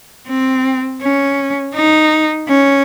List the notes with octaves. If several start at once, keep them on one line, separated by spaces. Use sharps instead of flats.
C4
C#4
D#4
C#4